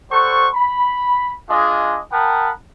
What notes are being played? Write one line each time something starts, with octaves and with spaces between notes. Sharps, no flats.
G3 A4 C5 F#5 C#6
B5
G#3 D4 F4 G#4 D#5
A#4 F#5 G5 A5 B5 D#6